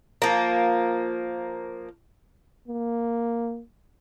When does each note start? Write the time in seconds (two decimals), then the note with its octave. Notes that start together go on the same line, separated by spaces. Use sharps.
0.22 F3 A#3
2.68 A#3